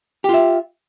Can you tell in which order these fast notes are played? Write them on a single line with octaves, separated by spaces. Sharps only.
G4 F4 E5